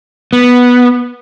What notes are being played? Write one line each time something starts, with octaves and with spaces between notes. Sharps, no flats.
B3